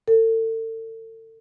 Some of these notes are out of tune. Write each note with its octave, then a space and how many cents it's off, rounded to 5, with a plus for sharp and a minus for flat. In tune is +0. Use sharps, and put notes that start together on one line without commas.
A4 +35